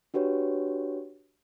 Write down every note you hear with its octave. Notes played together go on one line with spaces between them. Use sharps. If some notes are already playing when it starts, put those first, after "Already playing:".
D4 F#4 G4 B4 C#5